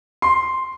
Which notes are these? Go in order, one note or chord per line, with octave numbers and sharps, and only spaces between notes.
C6